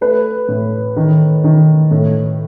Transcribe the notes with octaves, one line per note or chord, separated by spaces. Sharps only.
A3 B4
A2
D#3
D#3
A2